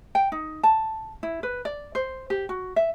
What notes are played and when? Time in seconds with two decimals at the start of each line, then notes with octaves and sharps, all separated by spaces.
0.15 G5
0.32 D#4
0.63 A5
1.23 E4
1.43 B4
1.65 D5
1.95 C5
2.30 G4
2.49 F#4
2.76 E5